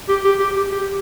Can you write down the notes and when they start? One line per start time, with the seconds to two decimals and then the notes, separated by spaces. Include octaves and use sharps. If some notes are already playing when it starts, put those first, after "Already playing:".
0.08 G4
0.24 G4
0.39 G4
0.56 G4
0.71 G4